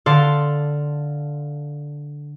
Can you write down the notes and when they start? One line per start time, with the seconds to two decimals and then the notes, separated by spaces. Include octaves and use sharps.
0.06 D3 A4 D5 F5 C6